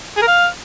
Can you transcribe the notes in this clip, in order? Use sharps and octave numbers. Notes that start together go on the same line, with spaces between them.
G#4
A#4
F5